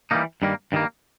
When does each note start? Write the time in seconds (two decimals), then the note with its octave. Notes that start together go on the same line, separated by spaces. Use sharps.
0.11 E3 G3 A#3 D#4
0.42 G2 D#3 G3 A#3
0.72 G2 D#3 G3 A#3